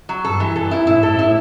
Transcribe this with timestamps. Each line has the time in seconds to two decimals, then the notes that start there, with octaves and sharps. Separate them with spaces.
0.09 F#3
0.24 G2 A4
0.40 E3
0.56 G2 A4
0.71 E4
0.87 A2 E4
1.03 A4
1.19 E4